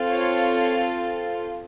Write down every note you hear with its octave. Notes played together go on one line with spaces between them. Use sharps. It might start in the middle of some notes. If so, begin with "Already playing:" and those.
Already playing: C4 F4 A4
C#5